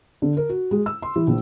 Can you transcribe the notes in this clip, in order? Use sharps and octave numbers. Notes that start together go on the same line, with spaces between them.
D3
A#4
F#4
G#3
E6
C6
E3
A#1